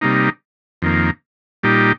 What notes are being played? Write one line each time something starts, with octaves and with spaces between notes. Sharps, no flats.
C3 G3 A#3 D#4
F2 D#3 A#3
A#2 G3 D#4 G4